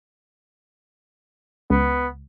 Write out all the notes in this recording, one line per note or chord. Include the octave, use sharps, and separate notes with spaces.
C#2 B3